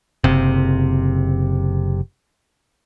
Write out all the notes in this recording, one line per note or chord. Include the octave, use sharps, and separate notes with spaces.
F#1 C3